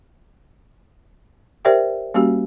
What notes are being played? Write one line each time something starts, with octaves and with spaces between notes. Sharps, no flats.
G4 A#4 C5 D5 E5 G5
G3 A#3 C#4 F#4 G4